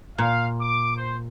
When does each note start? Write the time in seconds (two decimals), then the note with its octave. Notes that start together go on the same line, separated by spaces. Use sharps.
0.18 A#2 F5
0.60 D6
0.97 C5